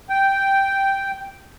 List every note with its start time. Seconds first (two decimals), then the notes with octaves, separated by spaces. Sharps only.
0.10 G5